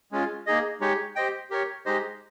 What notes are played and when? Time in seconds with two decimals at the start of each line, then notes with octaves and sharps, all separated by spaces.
0.12 G#3 C#4 F4
0.46 A#3 D#4 G#4 D#5
0.81 G#3 D#4 G4 C#5
1.16 G4 C5 D#5 G5
1.50 G4 A#4 C#5
1.86 G#3 D#4 G4 C5 D#5